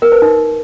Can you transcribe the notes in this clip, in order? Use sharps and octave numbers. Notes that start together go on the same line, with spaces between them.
A#4
B4
D#4